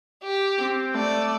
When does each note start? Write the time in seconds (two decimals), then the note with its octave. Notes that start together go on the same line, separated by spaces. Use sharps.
0.23 G4
0.59 C4
0.95 A3 D5